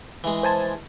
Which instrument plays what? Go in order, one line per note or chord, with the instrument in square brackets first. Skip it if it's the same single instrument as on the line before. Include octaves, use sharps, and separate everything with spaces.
[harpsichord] E3 G#3
[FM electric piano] C5 G#5 A5